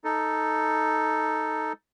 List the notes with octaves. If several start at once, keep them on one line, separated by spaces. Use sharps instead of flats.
D#4 A4